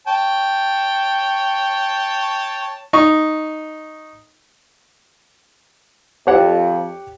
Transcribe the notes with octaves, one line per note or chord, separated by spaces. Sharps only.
C#5 G5 A5
D#4 C#6
F2 G4 C#5 F#5